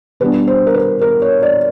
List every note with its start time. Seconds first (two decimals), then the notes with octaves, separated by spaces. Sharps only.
0.20 B2 G3 B3 D4 B4
0.47 C5
0.67 A#4
0.74 B4
1.01 A#4
1.22 C#5
1.42 D5